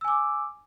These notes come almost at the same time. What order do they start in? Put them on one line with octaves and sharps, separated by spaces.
E6 G#5 D6